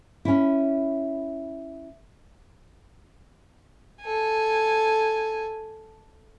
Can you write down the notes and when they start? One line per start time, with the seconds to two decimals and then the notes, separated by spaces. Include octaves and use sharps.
0.25 C#4 E4
4.02 A4 G#5